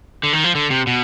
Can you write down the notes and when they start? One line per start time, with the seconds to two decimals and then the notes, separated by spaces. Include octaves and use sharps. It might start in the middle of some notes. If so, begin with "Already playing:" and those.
0.23 D3
0.33 D#3
0.44 F3
0.55 D3
0.70 C3
0.87 B2